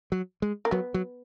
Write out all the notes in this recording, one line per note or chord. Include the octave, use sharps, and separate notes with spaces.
F#3
G#3
A#3
F#3 B3
F#3